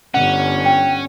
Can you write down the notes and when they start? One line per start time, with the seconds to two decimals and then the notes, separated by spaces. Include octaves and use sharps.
0.14 G1 C#4 F#5
0.65 G5